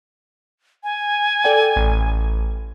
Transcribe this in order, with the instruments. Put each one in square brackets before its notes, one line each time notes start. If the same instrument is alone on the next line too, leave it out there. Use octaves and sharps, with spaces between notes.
[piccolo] G#5
[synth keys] A4 D5 G5
A1